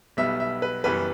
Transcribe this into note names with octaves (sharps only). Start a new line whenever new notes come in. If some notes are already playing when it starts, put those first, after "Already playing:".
B1 B2 G3 B3 E5
E5
B4
F#1 F#2 E3 G3 B3 B4